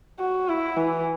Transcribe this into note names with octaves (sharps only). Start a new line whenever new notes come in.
F#4
E4
E3